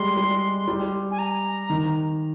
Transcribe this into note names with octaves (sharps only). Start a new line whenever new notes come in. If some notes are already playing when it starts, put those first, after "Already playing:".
Already playing: G3 G#3 C6
G3
G3
G#5
A#5
D#3